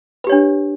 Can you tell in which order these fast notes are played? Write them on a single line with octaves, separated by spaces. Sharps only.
B4 G4 C#5 D4